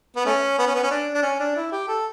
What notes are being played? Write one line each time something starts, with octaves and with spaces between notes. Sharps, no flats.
B3
A3 C#4
B3
C#4
B3
C#4
D4
D4
C#4
D4
E4
G4
A4